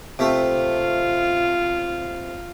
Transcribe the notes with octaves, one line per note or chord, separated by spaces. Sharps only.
C3 A3 F4